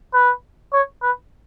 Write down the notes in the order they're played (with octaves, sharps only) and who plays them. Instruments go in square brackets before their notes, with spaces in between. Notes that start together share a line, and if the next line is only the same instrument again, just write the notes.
[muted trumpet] B4
C#5
B4